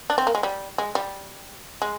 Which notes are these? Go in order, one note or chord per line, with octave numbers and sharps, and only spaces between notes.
D4
C4
A#3
G#3
G3
G#3
G3
G#3